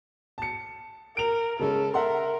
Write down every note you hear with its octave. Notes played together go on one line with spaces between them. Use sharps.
A5 C#7
A#4 D7 F7
C#3 G#3 C#4 A4
A#4 E5 F#5 C6